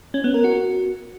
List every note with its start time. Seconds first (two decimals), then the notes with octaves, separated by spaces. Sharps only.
0.14 C#4
0.24 B3
0.34 A#4
0.44 F#4